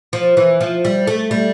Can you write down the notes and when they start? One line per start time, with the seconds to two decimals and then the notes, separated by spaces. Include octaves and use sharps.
0.13 F3
0.37 E3
0.61 F3
0.85 G3
1.07 A3
1.31 G3